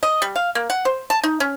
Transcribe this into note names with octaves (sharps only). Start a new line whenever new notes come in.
D#5
G3
F5
A#3
F#5
C5
A5
D#4
C#4